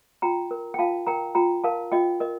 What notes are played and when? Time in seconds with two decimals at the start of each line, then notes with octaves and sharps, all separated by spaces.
0.22 F4 G5 A#5
0.51 A#4
0.74 G5
0.78 F4 F5 A5
1.07 A#4 G5 A#5
1.35 F4 G5 A#5
1.64 A#4 F5 A5
1.92 F4 D#5 G5
2.20 A#4 D#5